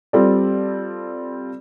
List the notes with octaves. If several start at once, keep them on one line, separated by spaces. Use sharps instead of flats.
G3 C4 F4 A4 D5